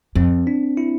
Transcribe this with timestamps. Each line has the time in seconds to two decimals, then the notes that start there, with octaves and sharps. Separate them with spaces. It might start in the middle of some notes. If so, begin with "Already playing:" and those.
0.15 F2 C4
0.47 D4
0.77 E4